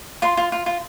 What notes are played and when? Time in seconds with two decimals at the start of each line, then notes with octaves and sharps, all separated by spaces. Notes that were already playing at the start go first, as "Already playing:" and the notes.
0.22 F4 C6
0.37 F4
0.52 F4
0.66 F4